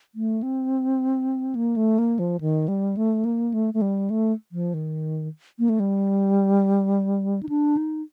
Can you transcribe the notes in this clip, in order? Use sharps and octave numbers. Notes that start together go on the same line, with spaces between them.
A3
C4
A#3
A3
A#3
F3
D#3
G3
A3
A#3
A3
A3
G3
A3
F3
D#3
A#3
A3
G3
D#4
D4
D#4